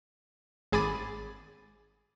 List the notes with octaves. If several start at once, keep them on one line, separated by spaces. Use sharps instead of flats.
G#1 G#4 G#5 B5 D6 A6